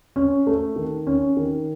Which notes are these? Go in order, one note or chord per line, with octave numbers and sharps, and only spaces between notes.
C#4
A3
D#3
C#4
D#3